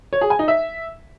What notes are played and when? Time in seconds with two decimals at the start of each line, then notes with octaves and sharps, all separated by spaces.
0.13 C#5
0.21 G#4
0.30 G#5
0.39 D#4
0.48 E5